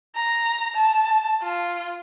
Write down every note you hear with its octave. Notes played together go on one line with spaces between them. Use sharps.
A#5
A5
F4